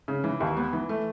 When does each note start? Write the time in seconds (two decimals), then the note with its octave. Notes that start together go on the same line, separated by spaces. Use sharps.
0.08 C#3
0.24 E3
0.40 D#2
0.57 B3
0.73 E3
0.89 A3